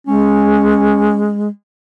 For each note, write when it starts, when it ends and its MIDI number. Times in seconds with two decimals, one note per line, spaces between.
0.07 1.48 56
0.07 1.35 61